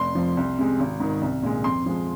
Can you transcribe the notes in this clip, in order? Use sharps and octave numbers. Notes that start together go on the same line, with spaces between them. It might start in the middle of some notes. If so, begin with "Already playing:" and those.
Already playing: F1 C6
F2 F3
C2
C3 G#3
G#1
G#2 D#3
C2
A#2 G#3
F2 C6
F3 G#3